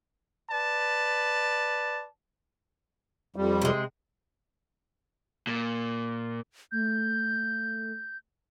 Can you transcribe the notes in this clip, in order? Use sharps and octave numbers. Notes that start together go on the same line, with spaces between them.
B4 D5 A5
F2 G3
C3 G#3
A#2
A3 G6